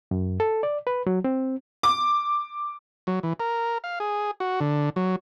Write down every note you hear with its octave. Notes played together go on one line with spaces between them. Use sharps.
F#2
A4
D5
B4
F#3
C4
D6
F#3
E3
A#4
F5
G#4
F#4
D3
F#3